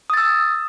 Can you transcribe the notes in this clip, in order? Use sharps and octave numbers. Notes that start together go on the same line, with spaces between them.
D#6 E6 A6